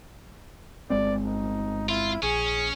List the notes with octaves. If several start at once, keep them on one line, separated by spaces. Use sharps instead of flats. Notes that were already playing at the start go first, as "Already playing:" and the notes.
G1 G#3 C4 D5
D#4
E4 F4
A#1 C#4 G#4